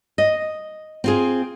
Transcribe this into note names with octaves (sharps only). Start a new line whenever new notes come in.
D#5
C4 F4 G#4